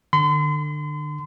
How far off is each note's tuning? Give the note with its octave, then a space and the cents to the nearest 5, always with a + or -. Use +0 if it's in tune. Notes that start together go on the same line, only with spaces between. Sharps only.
D3 +30 C6 -40